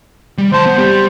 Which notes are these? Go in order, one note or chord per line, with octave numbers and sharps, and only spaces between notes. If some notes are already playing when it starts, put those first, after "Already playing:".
G3
D2 C5 A5
B3
G3 G4